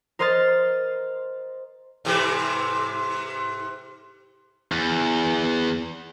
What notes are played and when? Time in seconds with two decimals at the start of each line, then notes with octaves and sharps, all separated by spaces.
0.19 A#4 C5 D#5 C6 F6 A6
2.05 G#2 C3 E3
4.72 E2